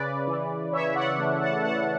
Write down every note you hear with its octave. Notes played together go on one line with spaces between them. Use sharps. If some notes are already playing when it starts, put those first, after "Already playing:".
Already playing: C#3 B4 D5
E3
C#3 C#5 E5
D5 F#5
A3
F#5 A5
A3 F#5 A5